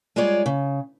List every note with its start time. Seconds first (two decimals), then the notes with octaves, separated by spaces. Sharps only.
0.16 G3 G#3 F4 G#4 C#5 D5
0.46 C#3